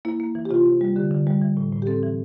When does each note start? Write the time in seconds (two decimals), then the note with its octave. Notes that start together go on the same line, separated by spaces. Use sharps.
0.05 A#3 E4
0.20 A#3
0.35 E3
0.45 G4
0.51 C3 F4
0.66 C3
0.81 G3
0.96 D3 G4
1.11 D3
1.27 G3
1.41 E3
1.57 A2
1.72 A2
1.82 G4
1.87 C4 A4
2.03 E3